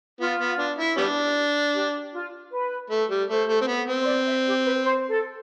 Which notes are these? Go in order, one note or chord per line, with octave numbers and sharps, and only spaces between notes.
B3 F4
B3
D4
E4
G3 B3 D4
G4
F4
B4
A3
G3
A3 C5
A3
C4
B3
C4
C5
D5
E5
G4
B4
C5
A4